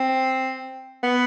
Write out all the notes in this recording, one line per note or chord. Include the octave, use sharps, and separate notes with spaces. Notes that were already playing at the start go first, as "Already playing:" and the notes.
Already playing: C4
B3